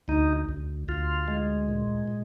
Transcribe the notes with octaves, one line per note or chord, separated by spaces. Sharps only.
D2 D#4
D2
D2 F4
G#3
A#2
A#2